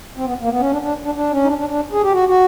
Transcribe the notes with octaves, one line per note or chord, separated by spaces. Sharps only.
C4
B3
A#3
B3
C#4
D4
D4
D4
D4
C#4
D#4
D4
D4
D4
G#4
G4
F#4
F#4